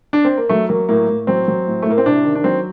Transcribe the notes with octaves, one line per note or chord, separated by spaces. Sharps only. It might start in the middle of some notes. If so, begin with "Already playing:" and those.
D4
C4
A#3
F#3 A3
F#3 A#3
A2 A#3
A2
F#3 C4
F#3
A2
A3
A2 A#3
C4
C3 D4
D#3
D4
F#3 C4